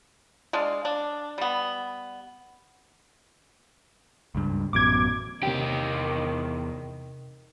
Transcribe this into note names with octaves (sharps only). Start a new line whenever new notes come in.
G#3 D4 D5 F5
D4
G3 B3
C#2 G2
A1 F#2 B2 D6 G#6
E2 C3 D#3 G4 G5